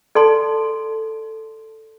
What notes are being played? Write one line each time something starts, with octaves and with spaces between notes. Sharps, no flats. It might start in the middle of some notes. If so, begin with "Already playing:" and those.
A4 D5 A5 C6